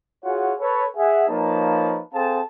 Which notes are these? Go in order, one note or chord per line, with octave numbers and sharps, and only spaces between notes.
F4 F#4 G#4 C#5 F#5
A4 B4 C#5
G#4 E5 F#5
F3 A#3 D#4 B4 C#5 A5
C4 G#4 A4 C5 F5 A5